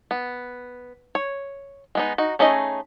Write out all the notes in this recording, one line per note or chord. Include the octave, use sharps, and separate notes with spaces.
B3
C#5
G#3 B3 D#4
D#4 F#4
A3 C#4 D#4 G#4 D#5